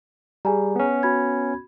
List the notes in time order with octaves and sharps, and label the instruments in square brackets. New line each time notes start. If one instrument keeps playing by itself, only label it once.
[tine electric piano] G3 [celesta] G#4 G#5 A#5
[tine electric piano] B3 C#4
[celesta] F#4 B5 G#6